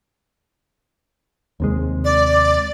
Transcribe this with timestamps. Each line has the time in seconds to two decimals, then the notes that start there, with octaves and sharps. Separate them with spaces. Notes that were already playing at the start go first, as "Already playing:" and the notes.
1.60 D#2 C3 G#3
2.05 D5